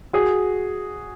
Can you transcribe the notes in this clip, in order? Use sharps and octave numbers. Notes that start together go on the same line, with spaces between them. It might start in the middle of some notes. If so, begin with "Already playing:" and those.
F#4 G#4